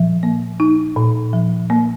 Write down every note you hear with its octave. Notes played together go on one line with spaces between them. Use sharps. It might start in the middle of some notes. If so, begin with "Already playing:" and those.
Already playing: A#2 F3
A#3
D#4
A#2
F3
A#3